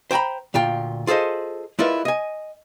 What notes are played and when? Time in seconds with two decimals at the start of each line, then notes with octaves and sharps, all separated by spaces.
0.11 C5 G5 G#5 A#5 B5
0.54 D2 A#2 F4 G5
1.07 F4 G#4 A4 C5 D#5
1.79 G#3 E4 F4 A#4 B4 D5
2.05 D#5 G#5